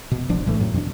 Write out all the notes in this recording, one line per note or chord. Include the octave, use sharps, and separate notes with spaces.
B2
D1 A1 F3 D4
B1 A2 E3 A3
F2 A2 F#3
E2 B2 D4